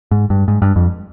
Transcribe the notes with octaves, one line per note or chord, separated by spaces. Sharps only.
G#2
G2
G#2
G2
F2